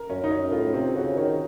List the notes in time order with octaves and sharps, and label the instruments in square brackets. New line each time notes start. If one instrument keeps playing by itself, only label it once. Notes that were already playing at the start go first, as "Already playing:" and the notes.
Already playing: [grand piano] A#4
[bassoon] F#2 [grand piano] C#4
[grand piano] D#4
C#4
[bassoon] A2 [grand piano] F4
[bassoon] C3 [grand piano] C4
[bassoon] C#3 [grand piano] F#4
[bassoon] D#3 [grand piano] C#5